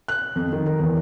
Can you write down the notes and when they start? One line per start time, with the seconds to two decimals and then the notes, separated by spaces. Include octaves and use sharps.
0.08 F#6
0.35 F2
0.53 D#3
0.66 A#4
0.80 E2